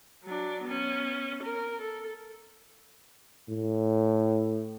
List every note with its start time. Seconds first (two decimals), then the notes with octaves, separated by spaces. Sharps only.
0.24 F#3 D4
0.64 B3 C#4
1.43 A#4
1.81 A4
3.49 A2